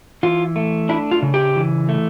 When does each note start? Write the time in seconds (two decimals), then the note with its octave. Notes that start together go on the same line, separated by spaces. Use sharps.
0.23 E3 F4
0.56 A3
0.89 D4 E4
1.11 F4
1.22 C#3
1.34 G4
1.56 E3
1.89 A3